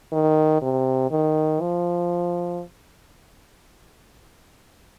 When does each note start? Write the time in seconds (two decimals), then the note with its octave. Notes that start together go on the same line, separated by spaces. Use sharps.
0.12 D#3
0.62 C3
1.11 D#3
1.61 F3